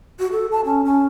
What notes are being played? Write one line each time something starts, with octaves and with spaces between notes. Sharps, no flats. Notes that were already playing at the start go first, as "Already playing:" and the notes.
F#4
A4
A5
C#4
C#4